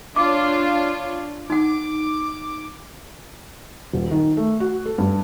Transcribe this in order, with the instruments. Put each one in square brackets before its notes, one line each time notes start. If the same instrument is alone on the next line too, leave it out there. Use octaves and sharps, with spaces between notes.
[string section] D4 F4 C#5 [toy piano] D6
[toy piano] D#4 F#5 [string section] D6
[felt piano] D#1
D#3
A3
F#4
A4
G2